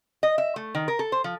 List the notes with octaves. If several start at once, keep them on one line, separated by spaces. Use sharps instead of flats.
D#5
E5
A3
D#3
A#4
A4
C5
F3